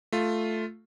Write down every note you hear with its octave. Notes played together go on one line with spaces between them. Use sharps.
A3 F4